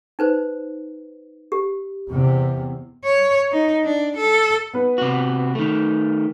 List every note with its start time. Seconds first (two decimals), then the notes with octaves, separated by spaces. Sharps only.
0.19 D#4 B4 C5
1.52 G4
2.09 E2 C3
3.04 C#5
3.52 D#4
3.85 D4
4.17 A4
4.74 B3 B4
4.98 C3 F#4
5.55 D#3 A3